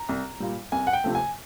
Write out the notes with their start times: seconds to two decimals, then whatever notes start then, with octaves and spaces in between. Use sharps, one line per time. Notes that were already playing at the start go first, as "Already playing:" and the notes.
Already playing: A#5
0.09 C2
0.40 A#2 G3
0.72 C2 G#5
0.87 F#5
0.93 G5
1.04 C3 F3 A3
1.15 G#5